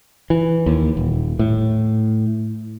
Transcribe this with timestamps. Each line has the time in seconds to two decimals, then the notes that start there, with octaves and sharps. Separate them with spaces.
0.30 E3
0.66 D#2
0.97 D#1
1.39 A2